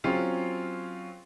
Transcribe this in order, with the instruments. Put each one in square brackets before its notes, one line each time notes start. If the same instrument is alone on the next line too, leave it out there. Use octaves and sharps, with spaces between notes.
[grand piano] F#3 C4 C#4 F4 G#4